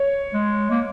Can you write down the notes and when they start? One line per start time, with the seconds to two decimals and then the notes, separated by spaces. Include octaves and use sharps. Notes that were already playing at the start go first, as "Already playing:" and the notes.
Already playing: C#5
0.34 G#3
0.71 A#3